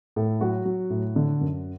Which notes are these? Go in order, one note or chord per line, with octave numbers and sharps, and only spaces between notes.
A2 A4
F#3 F#4
F#3
A2
D3
F#2